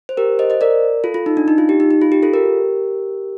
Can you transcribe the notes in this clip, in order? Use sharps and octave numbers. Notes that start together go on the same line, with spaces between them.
C5
G4 A#4
C5 D#5
C5 D#5
A#4 D5
F4 A4
F4
D#4
D4
D#4
F4
G4
D#4
D#4
F4
G4
F4 A4
G4 A#4